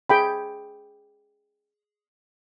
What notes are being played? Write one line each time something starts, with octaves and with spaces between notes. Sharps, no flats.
G#4 G5 B5